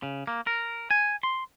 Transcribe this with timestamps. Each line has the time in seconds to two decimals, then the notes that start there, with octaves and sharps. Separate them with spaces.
0.03 C#3
0.27 A#3
0.47 A#4
0.91 G#5
1.23 C6